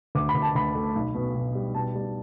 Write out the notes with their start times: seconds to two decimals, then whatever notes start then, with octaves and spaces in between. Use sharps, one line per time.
0.15 D2 D6
0.29 B5
0.34 D2
0.42 A5
0.55 D2 B5
0.75 A3
0.95 B1
1.15 B2
1.35 B2
1.55 G3
1.75 B2 A5
1.95 G3